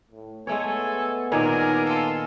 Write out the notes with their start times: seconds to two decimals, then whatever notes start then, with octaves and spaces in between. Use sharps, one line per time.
0.11 A2
0.47 G#3 A3 B3 A4 C#5 G#5
1.32 A#2 D#3 G#3 D4 A#4 C#5 G#5
1.85 F4 A4